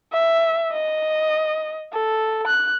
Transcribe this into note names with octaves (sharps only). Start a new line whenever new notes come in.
E5
D#5
A4
F#6